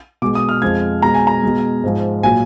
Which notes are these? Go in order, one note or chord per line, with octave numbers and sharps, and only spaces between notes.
B2 G#3 D6
D#6
F6
F2 F3 G#3 G#6
B2 G#3 A#5
G#5
A#5
B2 G#3
G#2 F3 G#3
A#2 F#3 G#5